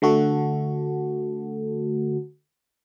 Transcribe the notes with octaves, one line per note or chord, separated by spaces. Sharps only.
D3 A3 F#4 A4